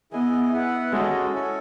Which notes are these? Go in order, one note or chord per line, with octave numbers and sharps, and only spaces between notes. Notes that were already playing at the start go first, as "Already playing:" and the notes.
B3 E4 G#4 D#5 G#5
B3 E4 B4 F#5
G#3 C#4 F#4 A4 D#5
C#4 E4 A4 C#5 G#5